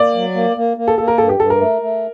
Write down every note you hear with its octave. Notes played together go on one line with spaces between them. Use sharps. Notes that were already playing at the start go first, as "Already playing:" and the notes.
Already playing: A#3 D5
F#3
A#3
A#3
A#3
A4
A#3 A4
A#4
G2 A4
G4
G2 A4
A#4
A3
A3